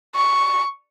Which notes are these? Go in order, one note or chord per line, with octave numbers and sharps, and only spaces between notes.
C#6